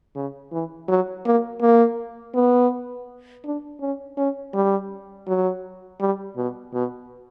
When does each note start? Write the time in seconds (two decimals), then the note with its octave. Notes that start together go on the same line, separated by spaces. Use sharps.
0.16 C#3
0.52 E3
0.88 F#3
1.26 A#3
1.62 A#3
2.35 B3
3.45 D4
3.81 C#4
4.17 C#4
4.54 G3
5.28 F#3
6.00 G3
6.37 B2
6.74 B2